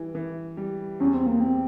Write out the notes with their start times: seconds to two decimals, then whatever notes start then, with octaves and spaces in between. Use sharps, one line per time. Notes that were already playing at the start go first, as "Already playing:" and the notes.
Already playing: E3 G3
0.15 E3
0.57 G3
1.00 E2 C#4
1.14 C4
1.26 A#3
1.40 E2 C4